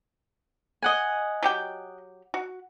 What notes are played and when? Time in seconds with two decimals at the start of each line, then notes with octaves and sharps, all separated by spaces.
0.82 D#5 F#5 G#5
1.43 F#3 G4 G5
2.34 F#4